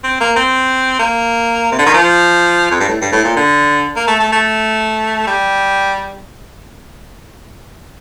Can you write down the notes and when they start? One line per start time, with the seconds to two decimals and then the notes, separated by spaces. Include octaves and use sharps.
0.04 C4
0.21 A#3
0.36 C4
0.99 A#3
1.72 C3
1.78 D3
1.86 D#3
1.94 F3
2.71 F2
2.80 G2
2.89 A2
3.01 G2
3.12 A2
3.24 A#2
3.36 D3
3.96 A#3
4.08 A3
4.20 A3
4.32 A3
5.27 G3